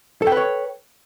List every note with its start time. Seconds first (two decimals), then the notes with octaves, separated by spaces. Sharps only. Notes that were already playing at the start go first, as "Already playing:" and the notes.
0.22 A4
0.27 G5
0.32 B4
0.37 C#5